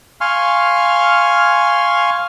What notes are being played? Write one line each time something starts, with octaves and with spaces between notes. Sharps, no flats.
F5 G#5 C6 C#6 F6